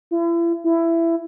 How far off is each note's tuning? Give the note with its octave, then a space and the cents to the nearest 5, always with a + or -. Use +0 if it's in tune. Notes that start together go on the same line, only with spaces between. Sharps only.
E4 +40
E4 +15